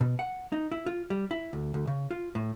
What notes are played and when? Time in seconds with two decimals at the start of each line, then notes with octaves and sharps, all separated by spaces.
0.01 B2
0.19 F#5
0.52 D#4
0.72 E4
0.86 F4
1.10 G3
1.31 E4
1.53 D2
1.74 D2
1.87 C#3
2.11 F4
2.35 A2